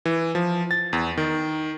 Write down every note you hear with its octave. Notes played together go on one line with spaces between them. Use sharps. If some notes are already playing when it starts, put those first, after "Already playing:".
E3
F3
A6
E2
D#3